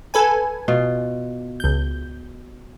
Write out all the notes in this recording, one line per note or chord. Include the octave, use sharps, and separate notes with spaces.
A4 B4 G#5
B2 F4
C#2 G6